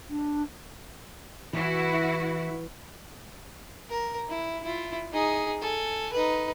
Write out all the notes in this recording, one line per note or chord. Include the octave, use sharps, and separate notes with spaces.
D4
E3 E4 F#4
A#4
E4
E4 F4
D#4 G#4
A4 G#5
D#4 B4